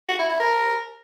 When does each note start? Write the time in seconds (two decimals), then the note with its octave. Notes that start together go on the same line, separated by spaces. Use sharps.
0.09 F#4
0.19 E4
0.29 E4
0.40 A#4